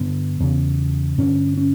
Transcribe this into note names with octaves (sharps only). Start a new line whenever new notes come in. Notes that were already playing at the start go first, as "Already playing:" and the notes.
Already playing: G2 D3 B3
E2 C#3
G2 D3 C#4
C#4